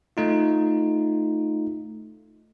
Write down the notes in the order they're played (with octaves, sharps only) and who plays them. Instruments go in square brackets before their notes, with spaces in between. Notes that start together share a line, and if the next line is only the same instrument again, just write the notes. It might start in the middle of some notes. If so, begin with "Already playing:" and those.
[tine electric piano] A3 D#4 F4